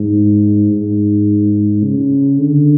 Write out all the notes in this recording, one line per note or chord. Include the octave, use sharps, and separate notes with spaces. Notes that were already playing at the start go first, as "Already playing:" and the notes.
Already playing: G#2
G#2
C#3
D3